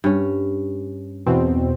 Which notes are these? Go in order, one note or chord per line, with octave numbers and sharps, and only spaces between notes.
G2 C#4
E2 B2 C4